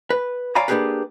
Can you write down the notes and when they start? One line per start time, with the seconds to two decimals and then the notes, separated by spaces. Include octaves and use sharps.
0.10 B4
0.55 C#5 D5 F5 G#5 A#5 B5
0.68 A#3 D4 F4 G4 G#4 B4